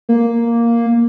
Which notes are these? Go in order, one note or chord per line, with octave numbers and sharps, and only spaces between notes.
A#3